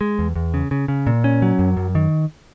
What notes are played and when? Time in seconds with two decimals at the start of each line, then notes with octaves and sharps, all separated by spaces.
0.01 G#3
0.19 E2
0.36 E2
0.54 C#3
0.71 C#3
0.88 C#3
1.07 A#2
1.24 C#4
1.42 F#3
1.59 F#2
1.77 F#2
1.95 D#3